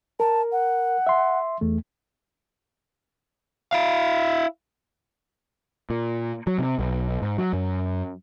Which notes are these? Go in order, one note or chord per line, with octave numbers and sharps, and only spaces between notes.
A#4 A5
F#5
E5 C6
E2 A3
E4 F5
A#2
F#3
C3
B1
G#2
F#3
F#2